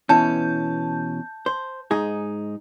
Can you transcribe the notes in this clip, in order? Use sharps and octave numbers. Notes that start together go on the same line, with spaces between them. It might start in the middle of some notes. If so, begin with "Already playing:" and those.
B2 E3 C#4 A5 G6
C5
G#2 D#4 G#4